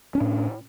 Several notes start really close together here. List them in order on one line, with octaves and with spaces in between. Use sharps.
C#4 D4 A2